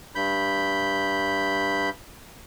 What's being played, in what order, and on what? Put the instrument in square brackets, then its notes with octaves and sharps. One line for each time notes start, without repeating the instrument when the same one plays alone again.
[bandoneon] G2 B5 G6